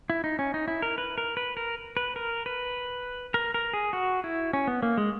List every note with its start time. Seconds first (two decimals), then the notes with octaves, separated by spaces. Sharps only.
0.10 E4
0.24 D#4
0.39 C#4
0.54 D#4
0.68 E4
0.82 A#4
0.98 B4
1.18 A#4
1.37 B4
1.57 A#4
1.97 B4
2.16 A#4
2.46 B4
3.34 A#4
3.54 A#4
3.73 G#4
3.93 F#4
4.24 E4
4.53 C#4
4.67 B3
4.83 A#3
4.98 G#3